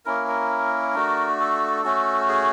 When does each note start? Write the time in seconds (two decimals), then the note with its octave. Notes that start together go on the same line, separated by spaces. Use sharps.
0.05 A#3 C#4 E4 A#4
0.28 A#4
0.95 A3 D4 F#4
1.40 A4
1.84 A3 C#4 F#4
2.29 G#4